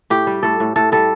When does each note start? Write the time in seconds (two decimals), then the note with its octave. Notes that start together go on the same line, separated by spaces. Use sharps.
0.10 A2 G4
0.27 G3
0.43 A2 A4
0.60 A2
0.76 A2 A4
0.92 G3 A4